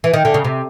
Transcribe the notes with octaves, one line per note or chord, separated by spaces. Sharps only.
E3
D#3
D3
C#3
C3